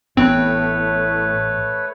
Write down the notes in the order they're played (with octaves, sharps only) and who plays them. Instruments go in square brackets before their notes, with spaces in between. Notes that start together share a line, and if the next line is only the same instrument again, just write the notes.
[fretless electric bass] A1 B3 [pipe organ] A2 [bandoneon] A3 B4 C#5 [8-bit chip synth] C4